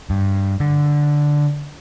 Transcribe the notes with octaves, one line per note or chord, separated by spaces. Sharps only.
G2
D3